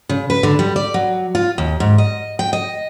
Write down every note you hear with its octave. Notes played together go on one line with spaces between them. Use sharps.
C#3
B4
D3
G3
D5
F#3
F4
D#2
G#2
D#5
G5
D#5